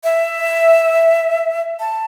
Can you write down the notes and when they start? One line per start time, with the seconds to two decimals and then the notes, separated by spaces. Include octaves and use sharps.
0.04 E5
1.80 A5